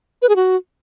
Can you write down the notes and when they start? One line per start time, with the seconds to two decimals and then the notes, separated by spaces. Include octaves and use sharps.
0.22 B4
0.29 G#4
0.36 F#4